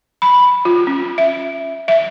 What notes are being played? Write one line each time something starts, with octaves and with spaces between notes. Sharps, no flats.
B5
F4
C#4
E5
E5